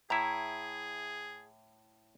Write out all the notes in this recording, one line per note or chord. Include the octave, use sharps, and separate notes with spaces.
A2 E4 G#4 A#5